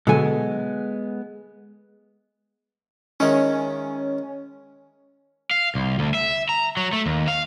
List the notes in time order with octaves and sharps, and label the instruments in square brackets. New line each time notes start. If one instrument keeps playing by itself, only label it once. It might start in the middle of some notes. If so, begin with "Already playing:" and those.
[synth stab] B2 D3 F#3 [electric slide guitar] G#3 B3 [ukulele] A4 G#5
[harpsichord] D#3 G#3 E4 [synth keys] C#4
[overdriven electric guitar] F5
C2
D2
E5
A#5
F#3
A3
D#2
F5